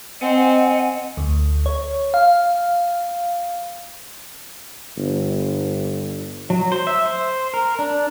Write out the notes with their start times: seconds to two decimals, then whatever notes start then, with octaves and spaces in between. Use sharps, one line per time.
0.21 C4 D#5 F#5 G#5
1.17 D2
1.66 C#5
2.14 F5
4.97 G1
6.50 F#3
6.72 C5
6.87 E5
7.06 C5
7.54 A#4
7.79 D4